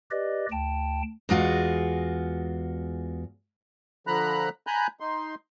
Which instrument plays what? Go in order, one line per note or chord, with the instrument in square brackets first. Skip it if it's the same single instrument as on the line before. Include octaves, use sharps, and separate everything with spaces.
[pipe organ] G4 B4 D5 D#5
D2 G5 A5
[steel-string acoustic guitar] E2 G#3 F4 F#4
[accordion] D3 F3 A#5 B5 F#6
G#5 A#5 B5 F#6 G6
D#4 C6